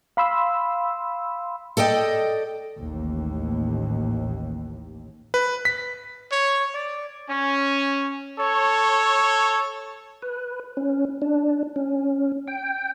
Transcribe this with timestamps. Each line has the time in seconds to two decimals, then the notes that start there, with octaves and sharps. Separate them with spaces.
0.17 F5 B5 C6 E6
1.77 A4 D5 D#5 G5
2.79 A1 D#2
5.34 B4
5.65 B6
6.32 C#5
6.74 D5
7.29 C#4
8.39 A4 C#5
10.22 B4
10.77 C#4
11.22 D4
11.76 C#4
12.48 G5